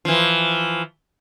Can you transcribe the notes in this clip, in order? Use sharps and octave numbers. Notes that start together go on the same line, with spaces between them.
E3 F3